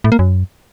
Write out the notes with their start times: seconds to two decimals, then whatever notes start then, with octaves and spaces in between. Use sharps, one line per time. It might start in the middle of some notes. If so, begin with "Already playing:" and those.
0.04 A2
0.12 A#3
0.19 F#2